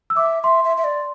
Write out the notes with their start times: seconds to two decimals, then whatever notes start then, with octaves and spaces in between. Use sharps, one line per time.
0.10 E6
0.16 E5 D6
0.43 E5 C6
0.64 E5
0.77 E5
0.84 D5